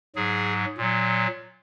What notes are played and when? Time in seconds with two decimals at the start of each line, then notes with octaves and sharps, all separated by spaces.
0.16 G#2 F#3 G#4
0.77 A#2 F#3